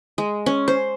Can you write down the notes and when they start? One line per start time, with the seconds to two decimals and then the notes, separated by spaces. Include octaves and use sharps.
0.18 G#3
0.46 C#4
0.68 C5